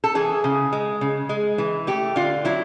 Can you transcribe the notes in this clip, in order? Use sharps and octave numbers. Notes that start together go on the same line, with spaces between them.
A4
E3 G#4
C#3
G#3
C#3
G#3
E3
A3 G4
D3 F4
F#3 E4